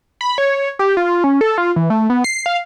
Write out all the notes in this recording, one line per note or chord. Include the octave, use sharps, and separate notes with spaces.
B5
C#5
G4
F4
C#4
A4
F4
E3
A3
B3
C7
F5